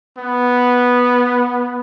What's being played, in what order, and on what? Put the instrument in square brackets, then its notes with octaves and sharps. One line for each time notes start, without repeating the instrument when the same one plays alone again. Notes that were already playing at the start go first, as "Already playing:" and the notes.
[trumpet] B3